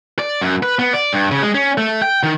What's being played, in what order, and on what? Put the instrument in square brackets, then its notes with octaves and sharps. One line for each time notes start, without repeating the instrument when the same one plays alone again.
[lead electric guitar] D5
F#2
B4
B3
D5
G2
C#3
G#3
C#4
A3
G5
D#3